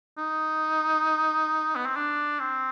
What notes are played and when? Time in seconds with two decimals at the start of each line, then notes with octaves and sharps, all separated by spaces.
0.18 D#4
1.75 B3
1.86 C4
1.95 D4
2.39 C4